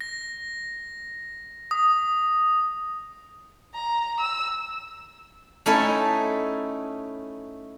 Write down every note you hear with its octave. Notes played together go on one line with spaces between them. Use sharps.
A#6
D#6
A#5
E6
A3 C#4 D#4 E4 A4